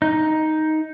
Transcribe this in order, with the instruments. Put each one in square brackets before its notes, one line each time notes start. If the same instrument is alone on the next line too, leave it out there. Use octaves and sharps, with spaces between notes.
[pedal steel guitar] D#4